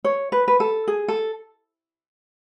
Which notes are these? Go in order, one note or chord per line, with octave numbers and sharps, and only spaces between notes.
C#5
B4
B4
A4
G#4
A4